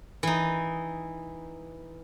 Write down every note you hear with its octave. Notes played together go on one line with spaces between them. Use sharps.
E3 D#4